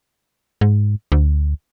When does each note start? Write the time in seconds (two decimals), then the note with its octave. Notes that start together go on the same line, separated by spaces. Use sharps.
0.61 G#2
1.12 D2